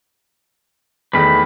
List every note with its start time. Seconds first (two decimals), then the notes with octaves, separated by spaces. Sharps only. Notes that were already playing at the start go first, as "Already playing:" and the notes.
1.13 E2 D#3 A3 B4 B5